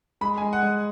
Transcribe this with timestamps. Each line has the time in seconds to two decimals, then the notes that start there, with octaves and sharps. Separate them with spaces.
0.21 G#3 B5
0.38 G#5
0.42 G#3
0.53 F#5
0.63 G#3